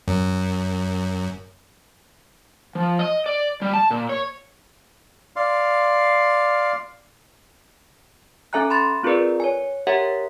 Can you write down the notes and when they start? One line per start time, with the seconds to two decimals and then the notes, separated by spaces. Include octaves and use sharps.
0.08 F#2
2.75 F3
2.99 D#5
3.26 D5
3.62 G3
3.74 A5
3.91 A#2
4.09 C#5
5.36 D5 F5 C6
8.53 C#4 A4 E5 G#5 A#5 F#6
8.70 B5 C6 A6
9.03 C4 F4 G#4 A#4 B4 D5
9.40 C#5 G#5
9.87 G4 A#4 C#5 E5 F#5 A#5